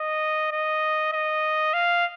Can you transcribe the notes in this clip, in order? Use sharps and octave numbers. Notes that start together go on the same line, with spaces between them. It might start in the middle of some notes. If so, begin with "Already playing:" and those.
Already playing: D#5
D#5
D#5
F5